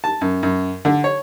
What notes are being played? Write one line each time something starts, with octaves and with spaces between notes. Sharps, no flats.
A5
F#2
F#2
D3
C#5